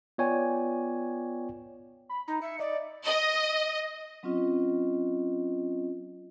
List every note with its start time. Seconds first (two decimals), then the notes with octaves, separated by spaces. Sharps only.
0.18 B3 F4 C#5 D5 G5 G#5
2.09 B5
2.28 D#4 A#5
2.42 E5 C#7
2.60 D5 D#5
3.06 D#5
4.23 F#3 C4 C#4 F4 D#5